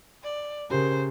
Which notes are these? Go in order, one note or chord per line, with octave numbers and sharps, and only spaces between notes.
D5
C#3 G4 A#4 C5